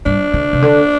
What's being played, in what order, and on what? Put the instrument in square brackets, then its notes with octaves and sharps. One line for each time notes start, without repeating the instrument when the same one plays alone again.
[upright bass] G2 [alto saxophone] D4
[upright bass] D3
C3
D3